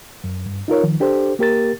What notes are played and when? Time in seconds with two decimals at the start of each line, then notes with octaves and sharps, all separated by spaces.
0.24 F#2
0.46 G2
0.68 D#4 F4 A#4 C#5
0.83 D#3 F3
1.00 D4 G4 A4 C5
1.39 A#3 G4 A#4 A6